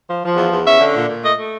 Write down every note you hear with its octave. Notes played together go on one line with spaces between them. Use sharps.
F3
F3
E2
E2
C#4 E5
D3
A#2
A#2
A3 D#5
A3